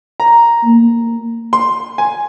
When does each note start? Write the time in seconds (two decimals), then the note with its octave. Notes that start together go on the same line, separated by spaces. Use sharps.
0.20 A#5
0.64 A#3
1.53 C6
1.98 G#5